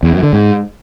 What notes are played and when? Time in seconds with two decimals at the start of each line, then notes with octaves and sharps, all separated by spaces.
0.03 E2
0.13 F#2
0.23 D3
0.33 G#2